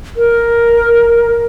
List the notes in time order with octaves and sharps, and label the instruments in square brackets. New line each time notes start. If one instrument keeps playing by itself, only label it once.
[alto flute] A#4